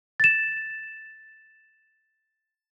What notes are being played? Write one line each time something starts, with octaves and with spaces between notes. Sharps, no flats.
A6 E7